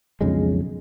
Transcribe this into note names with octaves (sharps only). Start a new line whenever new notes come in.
B1 F2 C#3 G#3